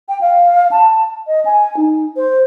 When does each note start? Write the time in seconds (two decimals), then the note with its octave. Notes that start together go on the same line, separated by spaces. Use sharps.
0.09 G5
0.21 F5
0.71 A5
1.27 D#5
1.45 G#5
1.77 D#4
2.17 C5